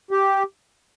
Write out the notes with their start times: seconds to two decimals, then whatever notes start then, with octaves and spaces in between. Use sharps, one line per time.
0.11 G4